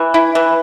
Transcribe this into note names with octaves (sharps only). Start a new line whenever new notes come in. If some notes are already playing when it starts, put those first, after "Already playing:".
Already playing: E3
E4
E3